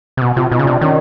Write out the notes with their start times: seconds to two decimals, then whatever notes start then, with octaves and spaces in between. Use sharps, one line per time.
0.17 C3
0.21 B2 F#4
0.36 C3 F4
0.51 B2 D#4
0.59 C#3
0.66 C3 D4
0.81 D#3 C#4